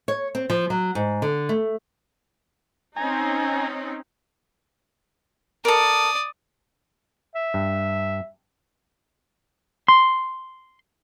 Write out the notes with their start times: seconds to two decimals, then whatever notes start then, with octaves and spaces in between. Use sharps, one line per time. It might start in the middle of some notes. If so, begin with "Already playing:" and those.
0.08 C#5
0.35 C4
0.50 F3
0.70 F#3
0.95 G#2
1.22 D3
1.49 A3
2.96 C4 C#4 D#4 G#5 A#5
5.65 A4 A#4 D5 D#6
7.35 E5
7.54 G2
9.88 C6